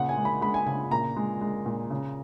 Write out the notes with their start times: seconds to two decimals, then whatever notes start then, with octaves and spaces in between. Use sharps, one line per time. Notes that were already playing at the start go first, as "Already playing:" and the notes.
Already playing: A#2 C#3 F#5
0.09 G#5
0.17 G#3
0.25 B5
0.41 G#3 B5
0.54 G#5
0.66 C#3 G#5
0.91 A#2 A#5
1.16 G#3
1.41 G#3
1.66 A#2
1.90 C#3